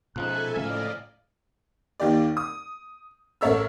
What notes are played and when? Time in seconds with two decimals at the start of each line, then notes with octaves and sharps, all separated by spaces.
0.16 C#2 B2 F3 D#4 A4 E5 G#5 F#6
0.56 A2 C#3 A3 C4 D5 D#5 F5
2.00 D#2 D#3 G4 D5
2.37 D#6
3.41 A1 A4 A#4 C#5 E5 E6